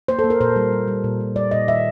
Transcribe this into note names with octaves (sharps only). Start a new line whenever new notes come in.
A#3 C5
A4
A#3
A#4
A#2 C5
G3
G3
G3
A#2
A#2
G3 D5
A#2 D#5
D#3 E5